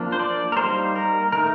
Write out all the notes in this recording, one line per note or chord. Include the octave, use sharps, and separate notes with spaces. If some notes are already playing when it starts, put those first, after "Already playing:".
Already playing: F3 A#3 D4
C5
D5
A#4
G3 A#3 D#4 C5
A#4
D#3 A3 D#4 A#4